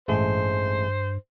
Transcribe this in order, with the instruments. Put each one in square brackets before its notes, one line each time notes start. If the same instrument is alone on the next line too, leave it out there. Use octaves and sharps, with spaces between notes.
[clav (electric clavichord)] A1 G#3 A3 [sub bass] G2 [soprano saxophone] C5